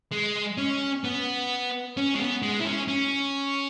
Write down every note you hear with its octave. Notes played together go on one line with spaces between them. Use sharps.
G#3
C#4
B3
C#4
G#3
B3
G#3
E4
C#4
C#4